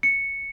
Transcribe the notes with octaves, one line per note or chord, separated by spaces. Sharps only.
C#7